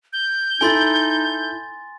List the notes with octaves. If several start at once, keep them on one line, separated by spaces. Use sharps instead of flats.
G6
D#4 E4 A4 G#5 C6 A6